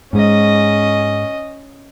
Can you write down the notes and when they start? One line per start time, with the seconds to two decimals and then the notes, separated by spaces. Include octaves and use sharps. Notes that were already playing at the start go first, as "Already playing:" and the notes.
0.13 G#2 G#3 C#4 D#5